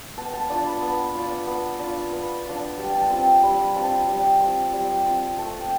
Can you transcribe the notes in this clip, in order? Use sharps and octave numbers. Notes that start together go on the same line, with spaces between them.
B3 A5
A5
D4 F4 A5
B5
B3
D4 F4
B3
D4 F4
B3 B5
D4 F4
A5
G3 G5
A5
C4 F4 G5
A5
G3 B5
C4 F4 A5
G3
C4 F4
G3
C4 F4
A3 A5
G5